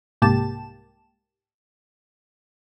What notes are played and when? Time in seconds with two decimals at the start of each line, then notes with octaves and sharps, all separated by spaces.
0.22 C2 G#2 A#3 G4 A5 E7